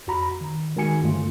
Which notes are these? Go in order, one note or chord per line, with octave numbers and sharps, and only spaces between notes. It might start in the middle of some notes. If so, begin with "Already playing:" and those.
F2 F#4 A#5 B5
D#3
D#3 G#3 F#4 G#5 C#7
G2 D3 A3 F4